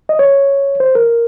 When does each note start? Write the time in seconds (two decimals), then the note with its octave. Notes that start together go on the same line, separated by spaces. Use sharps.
0.09 D#5
0.19 C#5
0.80 C5
0.95 A#4